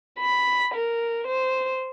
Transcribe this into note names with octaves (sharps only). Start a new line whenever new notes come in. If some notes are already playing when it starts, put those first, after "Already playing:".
B5
A#4
C5